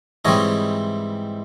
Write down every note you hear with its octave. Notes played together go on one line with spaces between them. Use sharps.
G#2 E3 G3 C4 C#5 D#5